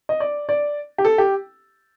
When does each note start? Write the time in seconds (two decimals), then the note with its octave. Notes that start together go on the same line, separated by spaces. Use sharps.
0.09 D#5
0.20 D5
0.49 D5
0.98 G4
1.05 A4
1.18 G4